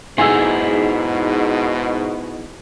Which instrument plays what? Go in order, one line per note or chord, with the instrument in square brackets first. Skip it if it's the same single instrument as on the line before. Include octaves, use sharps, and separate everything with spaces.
[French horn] G#2 [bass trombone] B2 [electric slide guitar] D#4 E4 G#4 [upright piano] G#5 E6